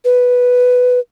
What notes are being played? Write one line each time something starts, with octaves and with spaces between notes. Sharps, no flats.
B4